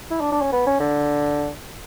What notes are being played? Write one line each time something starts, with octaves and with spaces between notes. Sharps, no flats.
E4
D4
D4
C#4
B3
C#4
D3